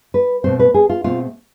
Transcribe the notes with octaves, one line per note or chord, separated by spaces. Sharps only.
B4
B2 A3 C4 C5
B4
G#4
F4
B2 A3 C4 F4